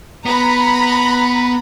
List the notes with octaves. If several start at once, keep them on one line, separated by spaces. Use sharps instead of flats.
B3 A#5 B5